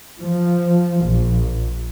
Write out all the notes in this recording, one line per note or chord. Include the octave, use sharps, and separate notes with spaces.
F3
A#1